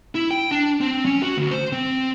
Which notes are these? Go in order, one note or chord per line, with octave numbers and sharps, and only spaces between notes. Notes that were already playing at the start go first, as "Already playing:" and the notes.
E4
G5
D4
C4
C#4
F#4
D2
C5
C4